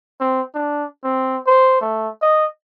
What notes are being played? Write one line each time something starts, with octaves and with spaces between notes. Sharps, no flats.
C4
D4
C4
C5
A3
D#5